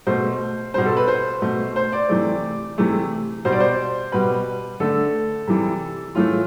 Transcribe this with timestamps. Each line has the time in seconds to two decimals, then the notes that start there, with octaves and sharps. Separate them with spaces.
0.07 B2 A3 C5
0.74 B2 G3 C5
0.86 A4
0.97 B4
1.08 C5
1.42 B2 A3
1.76 C5
1.93 D5
2.09 C3 E3 A3
2.78 C3 E3 A3
3.45 B2 G3 C5
3.52 D5
3.60 C5
4.12 B2 G3 B4
4.80 D3 A3 A4
5.47 C3 E3 G3
6.15 A2 E3 A3 F4